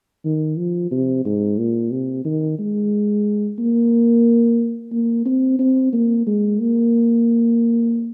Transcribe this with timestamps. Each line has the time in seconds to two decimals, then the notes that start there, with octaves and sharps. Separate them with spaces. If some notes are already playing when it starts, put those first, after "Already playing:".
0.25 D#3
0.58 F3
0.91 C3
1.25 G#2
1.58 A#2
1.91 C3
2.25 D#3
2.59 G#3
3.59 A#3
4.92 A#3
5.25 C4
5.59 C4
5.93 A#3
6.27 G#3
6.59 A#3